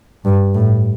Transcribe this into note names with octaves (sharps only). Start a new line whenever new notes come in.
G2
A2